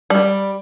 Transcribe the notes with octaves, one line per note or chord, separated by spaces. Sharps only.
G3